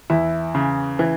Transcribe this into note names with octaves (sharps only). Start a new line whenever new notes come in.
E2 E4
C#3
E3